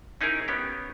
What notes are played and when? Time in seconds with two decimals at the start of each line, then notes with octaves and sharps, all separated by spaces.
0.21 C#4 D#4 E4 G#4 A#4
0.48 B3 C#4 G4